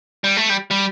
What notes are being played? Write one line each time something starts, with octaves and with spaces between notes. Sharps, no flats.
G3
A3
G3
G3